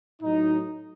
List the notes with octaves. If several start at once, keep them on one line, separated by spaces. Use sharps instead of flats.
A2 F#3 D#4